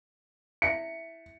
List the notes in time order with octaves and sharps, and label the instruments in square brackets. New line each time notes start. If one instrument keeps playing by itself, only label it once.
[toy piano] E4 E5 [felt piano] C#7